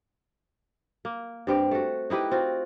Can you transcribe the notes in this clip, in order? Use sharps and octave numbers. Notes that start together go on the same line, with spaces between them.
A#3
G2 C4 G4
A3 F#4
D#4 E4 G4 B4
C4 F4 F#4